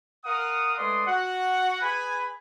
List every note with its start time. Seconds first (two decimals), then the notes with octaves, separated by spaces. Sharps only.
0.25 A#4 F5 F#5 D#6
0.77 G#3 A3 B4 D5 C6 D#6
1.06 F#4 F#5
1.81 G#4 B4 G#5 B5